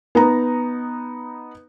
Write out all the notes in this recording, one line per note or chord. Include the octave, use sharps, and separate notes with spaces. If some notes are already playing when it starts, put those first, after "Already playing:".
B3 D#4 A#5